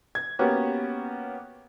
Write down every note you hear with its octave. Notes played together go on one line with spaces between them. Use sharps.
G#6
A#3 B3 C#4 F#4 G4